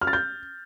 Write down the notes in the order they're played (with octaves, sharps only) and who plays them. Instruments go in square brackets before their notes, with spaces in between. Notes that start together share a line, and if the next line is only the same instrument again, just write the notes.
[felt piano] F6
A6
G6